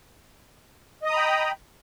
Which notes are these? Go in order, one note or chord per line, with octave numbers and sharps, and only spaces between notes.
D#5 G5 A#5 B5 D#6